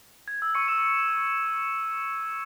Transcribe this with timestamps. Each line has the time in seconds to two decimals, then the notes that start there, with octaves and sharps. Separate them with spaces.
0.28 G#6
0.42 E6
0.55 C#6 C#7
0.68 E6 E7